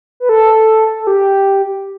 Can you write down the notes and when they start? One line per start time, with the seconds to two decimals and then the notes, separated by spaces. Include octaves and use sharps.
0.20 B4
0.29 A4
1.00 A4
1.07 G4